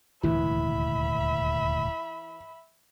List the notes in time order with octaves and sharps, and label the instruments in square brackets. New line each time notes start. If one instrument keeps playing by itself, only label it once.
[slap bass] D#1 D2 G#2 [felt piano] E3 [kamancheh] E5 B5